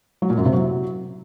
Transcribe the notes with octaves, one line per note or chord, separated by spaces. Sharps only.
F#3
A#2
F#2
C3
F#3